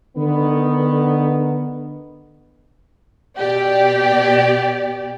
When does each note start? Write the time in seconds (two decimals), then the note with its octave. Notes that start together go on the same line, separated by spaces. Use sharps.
0.17 D3 D#3 B3
3.37 B2 G4 D5